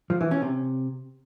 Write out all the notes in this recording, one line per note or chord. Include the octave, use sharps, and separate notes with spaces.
F3
E3
C#4
C3